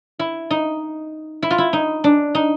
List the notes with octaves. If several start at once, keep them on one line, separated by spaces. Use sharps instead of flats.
E4
D#4
E4
F4
E4
D#4
D4
D#4